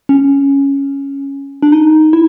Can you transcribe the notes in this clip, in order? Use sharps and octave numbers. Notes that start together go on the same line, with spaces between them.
C#4
D4
D#4
E4